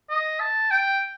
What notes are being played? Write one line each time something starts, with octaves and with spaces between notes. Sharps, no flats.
D#5
A5
G5